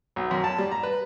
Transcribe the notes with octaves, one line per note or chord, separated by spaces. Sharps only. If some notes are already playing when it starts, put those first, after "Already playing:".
B1
F#2
A5
G3
A#5
B4